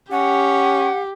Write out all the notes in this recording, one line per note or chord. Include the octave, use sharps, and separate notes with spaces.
C#4 G4 F#5